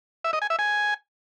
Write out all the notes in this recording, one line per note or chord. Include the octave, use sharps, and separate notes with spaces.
E5
D#5
G#5
E5
G#5